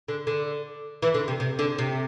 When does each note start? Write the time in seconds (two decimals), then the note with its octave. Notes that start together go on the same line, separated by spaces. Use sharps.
0.08 D3
0.27 D3
1.02 E3
1.14 D3
1.28 C3
1.40 C3
1.59 D3
1.79 C3